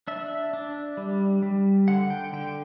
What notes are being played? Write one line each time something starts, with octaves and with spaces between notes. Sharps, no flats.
D4 E5
D4
G3
G3
D3 F#5
G5
D3 G5